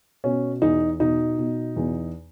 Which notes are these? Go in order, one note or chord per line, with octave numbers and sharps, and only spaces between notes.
B2 C#4
E2 D#4
B2 D#4
B2
E2